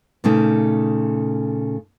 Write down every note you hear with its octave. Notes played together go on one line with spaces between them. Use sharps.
A#2 C#3 A3 D#4